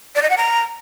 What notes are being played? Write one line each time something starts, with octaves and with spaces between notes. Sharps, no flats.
D5
D#5
F#5
A#5